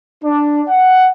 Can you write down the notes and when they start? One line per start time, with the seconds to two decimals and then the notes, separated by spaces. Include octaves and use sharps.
0.23 D4
0.67 F#5